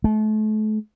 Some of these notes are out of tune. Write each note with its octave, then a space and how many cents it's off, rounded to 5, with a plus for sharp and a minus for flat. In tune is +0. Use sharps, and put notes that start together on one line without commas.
A3 -35